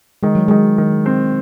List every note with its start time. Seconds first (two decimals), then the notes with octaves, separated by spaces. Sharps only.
0.23 D#3 G#3
0.35 F#3
0.48 D#3 G#3
0.78 D#3
1.06 C4